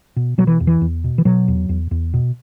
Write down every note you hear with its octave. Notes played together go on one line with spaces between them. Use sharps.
B2
B2 F#3
E3
E2
E3
E2
B2
E3
B2 F#3
E2
E2
E2
B2